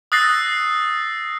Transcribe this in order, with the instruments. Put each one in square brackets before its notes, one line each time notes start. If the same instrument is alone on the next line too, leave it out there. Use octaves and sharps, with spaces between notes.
[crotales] D#6 E6 F#6 A6 A#6 C7